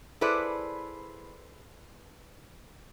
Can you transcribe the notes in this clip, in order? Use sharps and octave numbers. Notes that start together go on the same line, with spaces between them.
E4 G#4 A4 B4 C5 D5